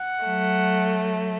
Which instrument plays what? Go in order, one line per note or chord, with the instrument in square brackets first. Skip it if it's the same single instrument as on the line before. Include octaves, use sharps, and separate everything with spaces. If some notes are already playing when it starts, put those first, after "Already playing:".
Already playing: [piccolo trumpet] F#5
[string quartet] F#3 A3